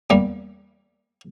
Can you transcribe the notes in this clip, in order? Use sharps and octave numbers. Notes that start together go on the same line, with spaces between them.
E2 G3 A#3